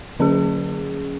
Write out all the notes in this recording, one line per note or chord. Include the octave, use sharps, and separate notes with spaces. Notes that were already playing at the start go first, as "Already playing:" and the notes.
D3 F#3 C#4 G#4